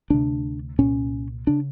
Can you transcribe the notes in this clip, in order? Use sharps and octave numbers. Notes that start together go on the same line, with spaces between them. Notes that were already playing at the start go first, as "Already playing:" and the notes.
D2 C3 D4
C2 A#2 C#4
C#3 D4